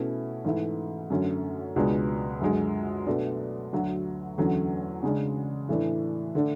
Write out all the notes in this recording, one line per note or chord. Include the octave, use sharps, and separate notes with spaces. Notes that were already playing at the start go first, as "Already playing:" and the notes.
Already playing: B2 A3 C#4 E4
G#2 E3 A3 E4
F#2 D3 A3 C#4
C#2 B2 G#3 D4
F#2 D3 G#3
B2 A3 D4
D2 D3 F#3
E2 D3 F#3 A3 C#4
C#3 G#3 D4
A2 E3 A3 D4
D3 A3 D4